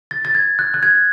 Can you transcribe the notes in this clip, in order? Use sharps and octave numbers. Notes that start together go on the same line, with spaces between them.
A6
A6
G#6
F#6
F#6
G#6